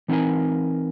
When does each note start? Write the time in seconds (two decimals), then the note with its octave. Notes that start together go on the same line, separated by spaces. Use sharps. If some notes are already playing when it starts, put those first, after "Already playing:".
0.08 E3 C4 D#4 A#4 G#5